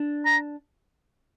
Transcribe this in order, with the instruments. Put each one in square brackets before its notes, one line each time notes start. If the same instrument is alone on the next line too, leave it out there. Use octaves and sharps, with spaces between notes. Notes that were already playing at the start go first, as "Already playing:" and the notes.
Already playing: [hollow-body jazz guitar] D4
[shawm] A#5